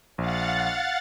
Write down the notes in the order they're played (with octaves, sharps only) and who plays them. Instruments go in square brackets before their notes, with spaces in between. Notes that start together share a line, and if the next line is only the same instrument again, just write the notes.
[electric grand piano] A#1 [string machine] F5 F#5 A6